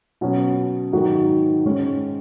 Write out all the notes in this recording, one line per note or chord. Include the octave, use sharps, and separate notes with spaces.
B2 F#3 C#4
G#2 D#3 F#3 D#4 F#4
G#2 G#3 C#4